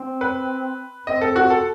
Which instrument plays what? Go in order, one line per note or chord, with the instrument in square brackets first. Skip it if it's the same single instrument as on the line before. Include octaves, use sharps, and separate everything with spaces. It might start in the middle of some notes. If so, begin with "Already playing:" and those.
Already playing: [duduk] C4
[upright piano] B4
[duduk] C4 [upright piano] D#5
[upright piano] A4
F#4
A4